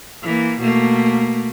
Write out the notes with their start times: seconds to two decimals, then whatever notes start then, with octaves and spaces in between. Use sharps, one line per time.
0.24 E3 A#3
0.60 B2 A3 A#3